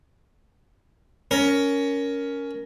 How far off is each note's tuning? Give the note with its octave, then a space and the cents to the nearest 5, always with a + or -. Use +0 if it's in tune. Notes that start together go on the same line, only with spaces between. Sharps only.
C#4 +15 A#4 +0